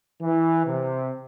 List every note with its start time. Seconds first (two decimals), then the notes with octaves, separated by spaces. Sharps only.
0.21 E3
0.65 C3